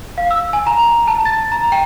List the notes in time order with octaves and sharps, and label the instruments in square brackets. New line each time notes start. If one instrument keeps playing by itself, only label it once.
[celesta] F5
E6
G#5
A#5
A5
A6
A#5
G5